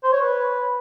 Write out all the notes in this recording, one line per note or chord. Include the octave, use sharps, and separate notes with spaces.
C5
C#5
B4